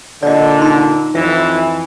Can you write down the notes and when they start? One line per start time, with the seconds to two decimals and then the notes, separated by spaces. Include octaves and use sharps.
0.23 A#2 D3 D5 D#5
0.60 D#4 C6
1.15 F2 E3 E5